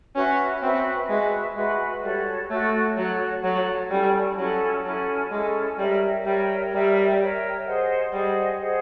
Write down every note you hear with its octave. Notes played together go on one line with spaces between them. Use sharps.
C#4 F#4 B4 E5
C4 F#4 B4 E5
G#3 F#4 B4 E5
G#3 F#4 B4 E5
G3 F#4 A4 C#5
A3 F#4 A4 C#5
F#3 F#4 A4 C#5
F#3 F#4 A4 C#5
G3 C#4 E4 A4
F#3 C#4 E4 A4
F#3 C#4 E4 A4
G#3 C#4 E4 A4
G3 A#4 C#5 E5 G5
G3 A#4 C#5 E5 G5
G3 A#4 C#5 E5 G5
A#4 C#5 E5 G5
G#4 C5 D#5 F#5
G3 G#4 C5 D#5 F#5
G#4 C5 D#5 F#5